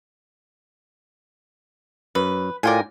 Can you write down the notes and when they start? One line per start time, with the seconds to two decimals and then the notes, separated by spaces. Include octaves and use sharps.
2.15 F#2 B4
2.63 A2 F4 A#4 D5 G5 G#5